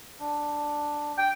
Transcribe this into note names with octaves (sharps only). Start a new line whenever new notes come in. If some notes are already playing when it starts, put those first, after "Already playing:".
D4
G5